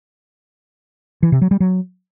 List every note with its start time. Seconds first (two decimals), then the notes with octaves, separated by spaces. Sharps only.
1.23 E3
1.32 C3
1.42 F#3
1.51 G3
1.60 F#3